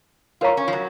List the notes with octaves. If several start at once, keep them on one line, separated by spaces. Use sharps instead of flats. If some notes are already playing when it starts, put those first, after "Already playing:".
F4 A#4 C#5 F5 A#5 C#6
C#4
F3
F#3